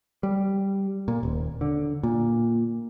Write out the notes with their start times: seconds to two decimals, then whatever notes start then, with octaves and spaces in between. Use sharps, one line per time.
0.23 G3
1.08 A#2
1.23 D#1
1.61 D3
2.03 A#2